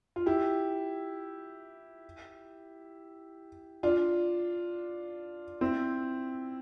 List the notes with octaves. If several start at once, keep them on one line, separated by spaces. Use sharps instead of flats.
F4
E4 G4
D4 F4
C4 E4